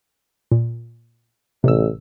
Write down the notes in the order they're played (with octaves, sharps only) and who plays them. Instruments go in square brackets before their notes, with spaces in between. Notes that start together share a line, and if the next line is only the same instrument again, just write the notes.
[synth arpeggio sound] A#2
[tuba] A1 [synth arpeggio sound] C3 E6